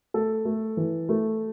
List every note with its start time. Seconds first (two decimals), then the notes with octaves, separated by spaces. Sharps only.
0.14 A3 A4
0.45 A3
0.77 E3
1.09 A3